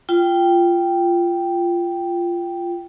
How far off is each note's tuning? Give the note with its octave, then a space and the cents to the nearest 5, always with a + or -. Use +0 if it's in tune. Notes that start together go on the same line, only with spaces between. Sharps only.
F4 -10 G5 +0